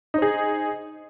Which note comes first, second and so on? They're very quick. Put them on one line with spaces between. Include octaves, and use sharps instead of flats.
D#4 C5 G#4